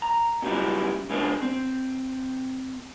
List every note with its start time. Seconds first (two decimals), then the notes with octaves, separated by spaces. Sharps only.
0.02 A#5
0.42 A#2 C#3 F#3 G3 D#4 E4
1.10 C#3 G#3 C#4 D4 A#4 C5
1.42 C4